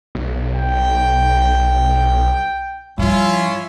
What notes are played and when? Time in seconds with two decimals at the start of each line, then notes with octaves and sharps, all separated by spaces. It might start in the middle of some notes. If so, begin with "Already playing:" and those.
0.15 B1
0.56 G5
2.98 G2 F3 C#4 E4 F4